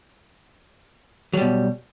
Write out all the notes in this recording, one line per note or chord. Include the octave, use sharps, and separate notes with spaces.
B2 F#3 G3